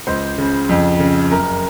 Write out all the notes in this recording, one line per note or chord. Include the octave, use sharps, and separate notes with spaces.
C#2 C5
C#3
F2
C#3
F#1 A#4